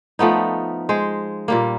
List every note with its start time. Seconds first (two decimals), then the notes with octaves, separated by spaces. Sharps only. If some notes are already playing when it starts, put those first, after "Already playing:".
0.19 F3 A3 B3 D#4
0.89 G#3 C5
1.48 A#2 G3 A#3